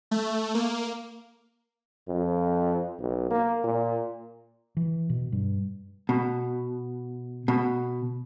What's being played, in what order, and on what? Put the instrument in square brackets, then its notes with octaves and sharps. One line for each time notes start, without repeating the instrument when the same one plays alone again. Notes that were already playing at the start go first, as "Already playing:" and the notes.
[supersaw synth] A3
A#3
[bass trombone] F2
B1
A#3
A#2
[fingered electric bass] E3
B2
G2
[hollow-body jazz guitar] B2
B2